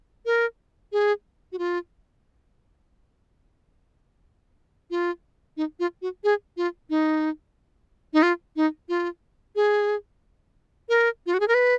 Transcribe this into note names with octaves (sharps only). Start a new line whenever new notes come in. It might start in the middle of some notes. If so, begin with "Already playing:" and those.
A#4
G#4
F#4
F4
F4
D#4
F4
F#4
G#4
F4
D#4
D#4
F4
D#4
F4
G#4
A#4
F4
F#4
G#4
A#4
B4